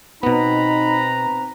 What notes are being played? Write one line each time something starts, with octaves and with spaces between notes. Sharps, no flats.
B2 B3 C4 D#4 B4 A#5 B5